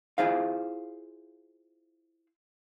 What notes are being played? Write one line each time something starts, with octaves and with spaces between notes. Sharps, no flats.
E4 F4 G#4 C5 F5